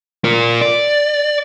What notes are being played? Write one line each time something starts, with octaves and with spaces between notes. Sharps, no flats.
F4 A#4
D5